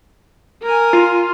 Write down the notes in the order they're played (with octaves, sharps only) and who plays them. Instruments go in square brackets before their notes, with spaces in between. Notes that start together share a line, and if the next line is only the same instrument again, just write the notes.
[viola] A#4 G#5
[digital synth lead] F4